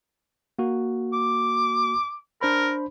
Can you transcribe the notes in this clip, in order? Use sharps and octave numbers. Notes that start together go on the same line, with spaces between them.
A#3 F#4
D6
D4 A#4 C5 B5